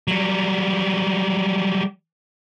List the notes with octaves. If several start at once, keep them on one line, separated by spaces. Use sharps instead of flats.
F#3 G3